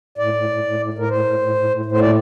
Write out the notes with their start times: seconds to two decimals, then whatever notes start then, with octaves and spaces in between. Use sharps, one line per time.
0.18 A2 D5
0.34 A2
0.49 A2
0.64 A2
0.79 A2
0.94 A2 A#4
1.09 A2 C5
1.25 A2
1.39 A2
1.55 A2
1.70 A2
1.85 A2
1.92 C5
2.00 A#2 D5